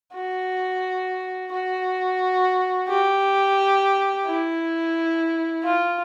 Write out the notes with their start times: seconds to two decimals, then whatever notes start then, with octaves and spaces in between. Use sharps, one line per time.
0.14 F#4
1.51 F#4
2.88 G4
4.25 E4
5.63 F4